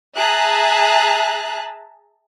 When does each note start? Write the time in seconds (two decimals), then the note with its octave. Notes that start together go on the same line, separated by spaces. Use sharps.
0.16 G#4 E5 A5 A#5 F#6